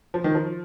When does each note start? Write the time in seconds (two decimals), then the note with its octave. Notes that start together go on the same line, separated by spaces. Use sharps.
0.14 F3
0.24 D#3
0.35 F3